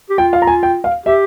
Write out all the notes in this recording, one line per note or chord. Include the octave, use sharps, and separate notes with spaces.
G4
F4 G5
F5
A#5
G#5
G5
F5
G4 E5